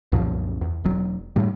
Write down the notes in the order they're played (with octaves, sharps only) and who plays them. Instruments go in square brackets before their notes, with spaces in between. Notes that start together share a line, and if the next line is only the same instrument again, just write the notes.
[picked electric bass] C2 F#2 A#2 F3
E2
E1 F#3
A2 G3